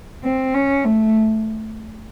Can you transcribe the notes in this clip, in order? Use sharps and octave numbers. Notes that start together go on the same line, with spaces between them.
C4
C#4
A3